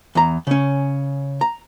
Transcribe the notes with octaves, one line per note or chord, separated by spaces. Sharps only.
E2 A#5
C#3 C#4
A#5